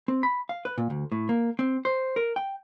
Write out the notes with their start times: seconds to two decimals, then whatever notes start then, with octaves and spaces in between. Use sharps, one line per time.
0.08 C4
0.23 B5
0.49 F5
0.65 B4
0.78 A#2
0.90 D2
1.12 A2
1.29 A#3
1.59 C4
1.85 C5
2.16 A#4
2.36 G5